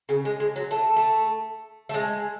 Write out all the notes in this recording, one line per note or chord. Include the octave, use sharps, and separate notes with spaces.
C#3
G#3
G#3
F#3
A3
A3
A3
G#3